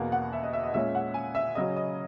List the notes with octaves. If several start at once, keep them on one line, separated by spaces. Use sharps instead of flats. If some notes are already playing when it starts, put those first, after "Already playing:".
Already playing: E2 B2 A#3 F#5
F#5
E5
D#5
E5
D#5
A#2 G#3 C#4 E5
F#5
G#5
E5
C#3 F#3 C#4 D#5
D#5